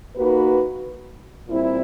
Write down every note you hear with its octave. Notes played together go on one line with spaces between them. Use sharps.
A#3 D#4 F#4 B4
A#2 G3 C4 E4